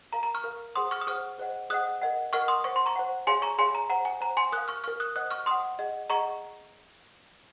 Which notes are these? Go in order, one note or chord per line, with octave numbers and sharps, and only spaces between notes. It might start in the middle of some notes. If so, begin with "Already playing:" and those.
A#4 F5 A#5
A#5
C#6 F6
A#4 F5
G#4 C5 F#5 C6 D#6
C#6 F6
D#6
G#4 C5 F#5 C#6 F6
G#4 C5 D#5 F#5
G#4 C5 D#5 F#5 D#6 F#6
A#4 D#5 F#5
A#4 D#5 F#5 C#6 F6
C6 D#6
C5 F#5 C#6
C6
A#5 C#6
C5 F#5
G#4 C#5 F5 G#5 C6
A#5 C#6
G#4 C#5 F5 G#5 C6
A#5
C5 F#5 A#5
G#5
C5 F#5 A#5
G#5 C6
A#4 D#6 F#6
F5
C#6 F6
A#4 F5 C#6 F6
D#6 F#6
C5 D#5 F#5 D#6 F#6
C#6 F6
C5 D#5 F#5 C6 D#6
G#4 D#5 F#5
G#4 D#5 F#5 A#5 C#6